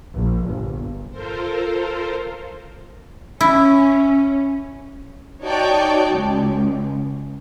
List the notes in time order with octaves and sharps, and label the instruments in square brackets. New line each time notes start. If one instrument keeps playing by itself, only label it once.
[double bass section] A#1
G1
[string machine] F4 A4 A#4 C5
[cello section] C#4 [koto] E4
[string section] D#4 F#4 C#5 D5 G5 A5
C#2